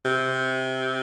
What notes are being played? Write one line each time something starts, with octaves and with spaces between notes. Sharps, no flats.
C3